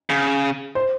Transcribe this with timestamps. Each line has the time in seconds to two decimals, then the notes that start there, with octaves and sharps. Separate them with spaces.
0.10 C#3
0.75 C5